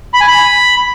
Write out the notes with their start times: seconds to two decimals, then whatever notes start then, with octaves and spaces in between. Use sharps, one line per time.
0.14 B5
0.20 G#5
0.27 B5